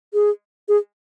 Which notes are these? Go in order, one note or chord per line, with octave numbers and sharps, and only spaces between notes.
G#4
G#4